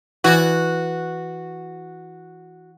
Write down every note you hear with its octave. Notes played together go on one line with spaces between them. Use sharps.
E3 F#4 D5